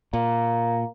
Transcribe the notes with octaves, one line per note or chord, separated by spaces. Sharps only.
A#2 A#3